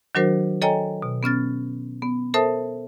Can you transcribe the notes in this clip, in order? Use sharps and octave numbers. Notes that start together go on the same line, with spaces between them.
D#3 F#3 D4 F#4 A#4 C5
A4 C#5 D#5 G5 G#5 A#5
B2
B3 C#4 F6 A6
B3
A4 A#4 C5 E5 A5 D#6